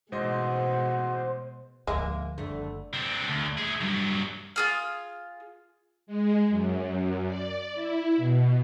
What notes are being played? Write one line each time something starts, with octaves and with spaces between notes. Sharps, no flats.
A1 G#2 B2 G#3 F#4 C5 D#5
D2 G#2 F3 G#3 A#3 E5
F#1 F2 D3 A3
C4 D4
D2
A3 G#4
G2 F#3
F4 G#4 F6
G#3
F#2
D5
E4
B2